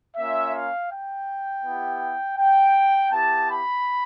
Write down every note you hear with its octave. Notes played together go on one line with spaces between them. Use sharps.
A#3 C#4 F4 E5
F5
G5
B3 E4 G4
G5
B3 E4 G4 A5
B5